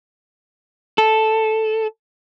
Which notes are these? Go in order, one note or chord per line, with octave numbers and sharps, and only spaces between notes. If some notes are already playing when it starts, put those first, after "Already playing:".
A4